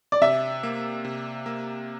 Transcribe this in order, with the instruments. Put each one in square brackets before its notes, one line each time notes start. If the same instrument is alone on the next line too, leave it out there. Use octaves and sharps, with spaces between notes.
[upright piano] D5
[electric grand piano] C3 [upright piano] E5
[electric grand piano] A#3
C3
A#3